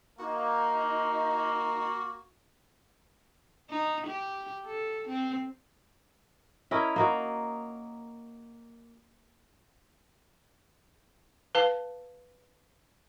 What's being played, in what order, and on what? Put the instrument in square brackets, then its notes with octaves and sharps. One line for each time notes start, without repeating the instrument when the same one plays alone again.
[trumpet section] A#3 [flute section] D#4 [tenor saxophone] F#4
[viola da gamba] D#4
G4
A4
C4
[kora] C#4 E4 A#4 D#5
A#3 D#4 F#4
[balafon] B4 F5 A5